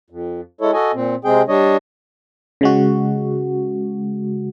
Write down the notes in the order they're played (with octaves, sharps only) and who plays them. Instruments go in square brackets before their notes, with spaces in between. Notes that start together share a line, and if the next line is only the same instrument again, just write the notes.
[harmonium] F2
G#3 E4 A4 C#5
F#4 A4 D#5 G#5
A#2 C4
C3 G#3 C4 G#4 G5
G3 D4 C#5 D#5
[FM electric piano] C#3 G#3 F#4